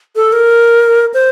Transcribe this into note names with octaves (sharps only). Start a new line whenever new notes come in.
A4
A#4
C5